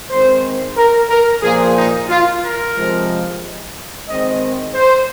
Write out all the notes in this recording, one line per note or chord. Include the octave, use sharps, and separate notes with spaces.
D#3 G#3 C4 C5
A#4
A#4
A#2 F3 A#3 G#4
D#4
F4
A#4
C3 F3 G#3
D#3 G#3 C4 D#5
C5